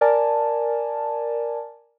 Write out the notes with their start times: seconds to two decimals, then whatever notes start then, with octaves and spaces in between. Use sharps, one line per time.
0.01 A#4 D5 G#5 A5